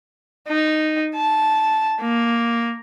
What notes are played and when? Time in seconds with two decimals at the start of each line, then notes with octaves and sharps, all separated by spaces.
0.48 D#4
1.16 A5
2.01 A#3